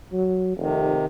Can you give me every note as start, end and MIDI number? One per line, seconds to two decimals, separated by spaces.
0.13 0.55 54
0.57 0.98 29
0.57 1.06 48
0.57 1.06 51